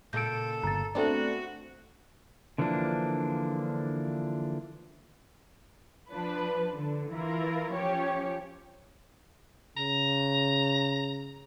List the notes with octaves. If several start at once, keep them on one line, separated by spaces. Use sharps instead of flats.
A#2 C#3 A4 G6 D7
G1 A#5 A6
A3 B3 C4 D4 F#4 A4
D3 E3 F3 A#3 D4
F3 D4 B4
D3
E3 E4 F4 A#4
F3 C#4 G4 C#5
C#3 A#5